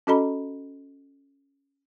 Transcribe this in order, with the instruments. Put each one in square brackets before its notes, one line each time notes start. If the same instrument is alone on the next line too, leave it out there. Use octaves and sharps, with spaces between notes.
[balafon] C#4 F#4 A4 D#5 A#5 B5